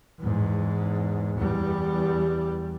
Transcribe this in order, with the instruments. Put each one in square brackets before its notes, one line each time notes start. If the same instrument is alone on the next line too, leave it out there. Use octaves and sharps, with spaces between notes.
[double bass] E2 G#2
E2 G3